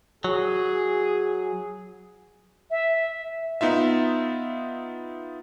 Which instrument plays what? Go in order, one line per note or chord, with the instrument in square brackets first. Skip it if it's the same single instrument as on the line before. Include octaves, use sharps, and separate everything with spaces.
[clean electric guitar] F#3 [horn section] G#4
[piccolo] E5
[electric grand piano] B3 D#4 F4 E5